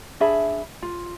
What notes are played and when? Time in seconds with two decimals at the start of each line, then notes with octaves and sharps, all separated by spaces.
0.20 D4 G#4 E5 B5
0.82 F4